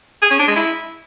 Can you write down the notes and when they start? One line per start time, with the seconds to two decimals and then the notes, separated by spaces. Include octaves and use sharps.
0.22 G#4
0.31 C#4
0.39 D4
0.48 G#3
0.56 E4